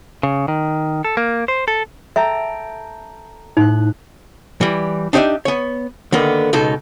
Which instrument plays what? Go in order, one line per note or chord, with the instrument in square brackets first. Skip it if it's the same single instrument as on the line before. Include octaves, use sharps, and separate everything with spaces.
[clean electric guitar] C#3
D#3
A4
A#3
C5
A4
[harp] A4 G5 A#5 [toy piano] E5
[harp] A2 F#6 [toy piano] D#4
[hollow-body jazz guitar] E3 G3
D4 D#4 G4 C5 D5 E5
B3 C#5
D3 D#3 A#3 B3
C#2 B2 D#4 A4